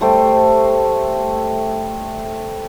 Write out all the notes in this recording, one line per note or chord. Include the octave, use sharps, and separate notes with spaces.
G3 A3 C5 G5